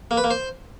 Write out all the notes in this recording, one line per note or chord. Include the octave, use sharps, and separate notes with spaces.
A#3
B4
A#3
C5